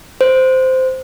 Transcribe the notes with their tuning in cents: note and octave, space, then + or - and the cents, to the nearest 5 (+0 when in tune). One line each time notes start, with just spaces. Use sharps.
C5 -10